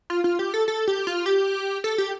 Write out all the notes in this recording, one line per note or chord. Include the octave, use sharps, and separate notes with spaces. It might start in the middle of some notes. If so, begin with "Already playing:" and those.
F4
F4
G4
A4
A4
G4
F4
G4
A4
G4